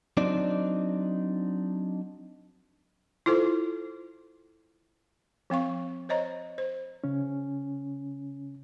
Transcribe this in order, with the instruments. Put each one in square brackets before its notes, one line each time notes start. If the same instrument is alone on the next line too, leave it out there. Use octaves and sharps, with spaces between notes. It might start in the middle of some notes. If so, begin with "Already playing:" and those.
[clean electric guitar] F#3 C4 D4 D#4 D5
[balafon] E4 F4 A4 C5
F3 C4 F5 C#6
C5 C#5 D#5 A#5
C5
[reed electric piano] C#3 C#4